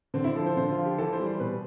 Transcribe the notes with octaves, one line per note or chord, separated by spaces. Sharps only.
D3 C4
E4
F3 A4
C5
D3 C5
F4
F3
G4
E3 A4
C5
G3
C5
B2 B4